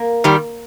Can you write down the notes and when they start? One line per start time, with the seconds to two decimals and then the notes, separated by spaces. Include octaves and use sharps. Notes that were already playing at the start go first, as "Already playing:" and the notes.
Already playing: A#3
0.24 D#3 G3